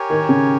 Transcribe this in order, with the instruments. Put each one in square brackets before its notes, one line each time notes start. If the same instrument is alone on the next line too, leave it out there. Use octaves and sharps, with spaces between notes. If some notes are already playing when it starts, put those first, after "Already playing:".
Already playing: [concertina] G4 A#4 C#5 G#5
[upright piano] D#3
C#3